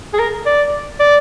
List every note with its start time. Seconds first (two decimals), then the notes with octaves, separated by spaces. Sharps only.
0.13 G#4
0.19 A#4
0.46 D5
1.00 D5